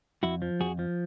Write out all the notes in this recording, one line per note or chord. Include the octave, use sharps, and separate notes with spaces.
F2 E4 F#4
F3
F2 F#4 G#4
F3